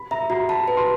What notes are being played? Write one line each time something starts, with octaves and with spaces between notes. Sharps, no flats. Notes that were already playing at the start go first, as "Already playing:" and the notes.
Already playing: B5
E5 A#5
F#4 A#5
A5 B5
B4
C6